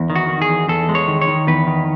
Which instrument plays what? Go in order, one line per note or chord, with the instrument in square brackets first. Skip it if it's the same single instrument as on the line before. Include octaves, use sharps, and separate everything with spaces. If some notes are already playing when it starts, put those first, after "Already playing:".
Already playing: [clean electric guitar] E2
D#3
F#4
D#3
G#4
E2
E2 A4
G#3
C#5
D#3
C#5
D#3
E2 B4
D#3